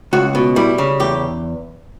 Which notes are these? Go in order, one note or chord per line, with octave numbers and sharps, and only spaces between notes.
C#2 F#4
B2
G3 E4
C#3
E2 G4